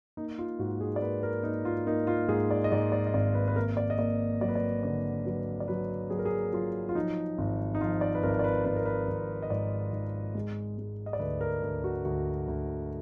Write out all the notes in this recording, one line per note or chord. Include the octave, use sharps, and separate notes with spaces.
A#3 D#4
F4
G#2 F#4
G#4
D5
A#3 B4
A#4
A#3 D#4
F4
A#3 D#4
F4
G#2 G#4
D5
D#5
G#2 D5
D5
D#5
G#1 D5
B4
B4
A#3 A#4
D5
D#5
A#3 D5
F#3 D5
B4
D5
D3 D5
F#3 B4
D5
F#3 B4
F#3 G#4
A#4
G#4
F#3 F4
F4
F3 D#4
G#1
D#4
F3 F4
D5
B4
G#1 A#4
D5
B4
G#1 B4
A#4
B4
G#1
D#5
G#2 D5
G#2
G#3
G#3
D#5
D5
D2 B4
A#4
D2
F#4
D2 F#4
D2